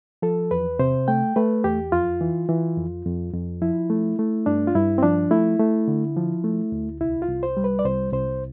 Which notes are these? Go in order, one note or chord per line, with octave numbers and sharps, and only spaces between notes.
F3 A4
E2 B4
C3 C5
A3 G5
A3 B4
E2 G4
F2 F4
E3
E3
F2
F2
F2
F3 E4
A3
A3
G2 D4
F4
G2 E4
C4
F3 D4
A3 E4
A3
D3
F3
A3
D2
C2 E4
F4
C2
C5
G3
B4
D5
C2 C5
C2 C5